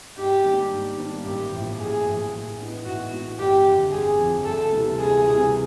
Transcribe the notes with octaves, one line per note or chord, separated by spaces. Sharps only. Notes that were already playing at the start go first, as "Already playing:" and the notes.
G#2 G4
D#3 G3 A#3 D4
G#2
D#3 G3 A#3 D4
A1 G4
A2 F3 A#3
A1 G#4
A2 F3 A#3
A2
E3 G#3 B3 D#4
A2 F#4
E3 G#3 B3 D#4
G1 G4
F2 D3 F3
G1 G#4
F2 D3 F3
D2 A4
C3 E3 G3
D2 G#4
C3 E3 G3